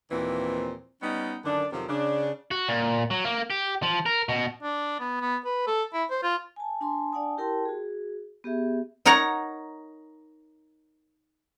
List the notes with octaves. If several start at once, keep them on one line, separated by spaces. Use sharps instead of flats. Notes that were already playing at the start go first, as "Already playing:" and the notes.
D#2 A#2 E3 F3 C4
G3 B3 C#4 D#4
F#2 D3 D#3 D4
F2 C3 D#3 F3 F#3 C4
C#3 D4
F#4
A#2
F#3
A#3
G4
F3
A#4
B2
D4
B3
B3
B4
A4
E4
C5
F4
G#5 A5
D4 G#5 A5 C6
D4 D5 F#5 G#5 A5 D#6
E4 G4 A#4 G5 A5 C6
F#4 G#4
B3 G4 G#4 E5
D#4 A#4 C#5 F#5 A#5